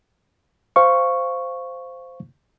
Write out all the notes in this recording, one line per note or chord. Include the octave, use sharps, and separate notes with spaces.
C5 F5 C#6